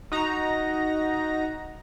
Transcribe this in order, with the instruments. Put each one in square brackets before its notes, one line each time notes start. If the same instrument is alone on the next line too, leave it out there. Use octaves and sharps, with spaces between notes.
[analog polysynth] D#4 F#4 A#5